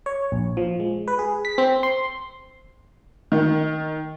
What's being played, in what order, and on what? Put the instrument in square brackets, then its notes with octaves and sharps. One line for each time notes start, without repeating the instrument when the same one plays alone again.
[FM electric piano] C#5
A#1
F3
G#3
B4
G#4
B6
C4
C6
[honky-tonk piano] D#3